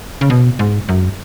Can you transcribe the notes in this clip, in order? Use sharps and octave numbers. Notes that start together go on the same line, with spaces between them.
C#3
B2
G#2
F#2